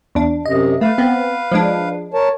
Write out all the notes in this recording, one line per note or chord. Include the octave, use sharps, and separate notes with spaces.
E2 D4
F#2 C3 D#5
A3 B4 F5
B3 C4
F3 G#3 D4
A#4 C#5 A5